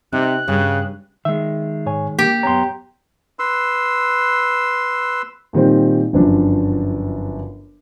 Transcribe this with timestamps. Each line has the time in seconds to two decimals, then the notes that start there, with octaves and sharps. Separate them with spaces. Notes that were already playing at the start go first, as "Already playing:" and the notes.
0.13 C3 C4 D#4 F#6
0.48 G2 C#3
1.25 D#3 G#3 E5
1.86 G#2 C#5 G#5
2.19 A#3 G4
2.43 F#2 B3 C#5 A#5 C6
3.39 B4 C6 E6
5.53 A#2 D#3 G3 C4
6.13 G1 F#2 F3 D4